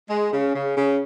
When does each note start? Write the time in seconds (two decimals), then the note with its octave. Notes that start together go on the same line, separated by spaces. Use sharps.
0.10 G#3
0.32 C#3
0.55 C#3
0.77 C#3